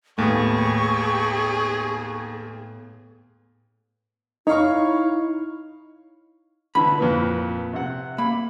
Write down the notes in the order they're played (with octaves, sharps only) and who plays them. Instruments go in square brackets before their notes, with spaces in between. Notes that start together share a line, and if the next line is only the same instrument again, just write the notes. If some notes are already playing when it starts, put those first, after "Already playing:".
[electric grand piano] D#2 A3 [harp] A2 B3 [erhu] G#4 [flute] C#6
[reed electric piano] D#4 [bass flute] E4 [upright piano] C#5 F5 C#6
[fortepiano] D3 E3 [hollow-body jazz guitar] B5
[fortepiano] F2 A#2 B4
C3 F#5
[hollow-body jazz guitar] A#3 [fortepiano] B5